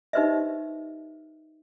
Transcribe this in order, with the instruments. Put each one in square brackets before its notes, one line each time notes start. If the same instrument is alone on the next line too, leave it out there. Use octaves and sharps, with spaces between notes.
[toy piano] D#4 G4 B4 C5 D#5 E5